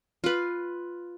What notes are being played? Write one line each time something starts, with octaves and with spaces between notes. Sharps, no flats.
F4 B4